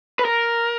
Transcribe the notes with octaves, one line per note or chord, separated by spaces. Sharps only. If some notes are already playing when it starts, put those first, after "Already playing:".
B4
A#4